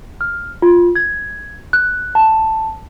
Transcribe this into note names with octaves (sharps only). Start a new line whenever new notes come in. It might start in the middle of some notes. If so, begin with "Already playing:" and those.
F6
F4
G#6
F#6
A5